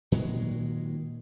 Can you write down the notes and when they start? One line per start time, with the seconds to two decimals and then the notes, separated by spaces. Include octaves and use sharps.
0.12 A#2 D#3 F#3 G#3